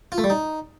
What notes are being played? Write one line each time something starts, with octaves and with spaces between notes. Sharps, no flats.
F4
A3
G3
D#4